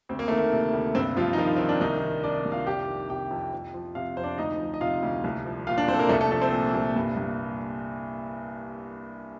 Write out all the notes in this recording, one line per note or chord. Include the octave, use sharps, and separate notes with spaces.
D2 C4
A#3
D#3 A3
A#3
C3
D2
G2 C3 C4
G2 F3 F4
D#4
D#3 F3 F4
D#3 C4
D4
C2 D#3 D#4
D#3
C3 D4 D5
C2
F4 F5
F2 G4 G5
D#3
C3 G4 G5
F2
F2
F3
C3 F4 F5
F2 C5
D4 D5
D2 D#4 D#5
F3
D#5
C3 F4 F5
D2
C2
F3
A#2 F4 F5
D4 D5
C2 C4 C5
A4
A#3 A#4
C2 A3 A4
A3 A4
F3 A3 A4
C4 C5
A#2
C2
G2
G2